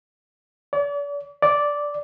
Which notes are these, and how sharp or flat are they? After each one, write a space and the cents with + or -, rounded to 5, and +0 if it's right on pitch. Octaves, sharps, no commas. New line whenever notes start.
D5 -40
D5 -5